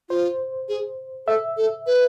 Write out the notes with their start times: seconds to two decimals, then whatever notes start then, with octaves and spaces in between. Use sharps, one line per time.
0.09 F4 C5
0.69 G#4
1.27 A4 E5
1.57 A4
1.86 B4